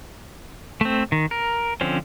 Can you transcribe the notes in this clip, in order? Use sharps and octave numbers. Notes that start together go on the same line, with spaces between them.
A3 C4
D#3
A#4
D3 F3 C4 C#4